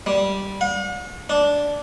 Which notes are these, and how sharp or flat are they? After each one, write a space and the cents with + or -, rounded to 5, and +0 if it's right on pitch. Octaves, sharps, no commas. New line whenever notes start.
G3 -5
F#5 -45
D4 -10